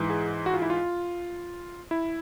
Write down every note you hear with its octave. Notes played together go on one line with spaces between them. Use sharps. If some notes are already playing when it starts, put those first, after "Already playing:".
Already playing: G#2 E3
G#4
F#4
F4
E4
F4
E4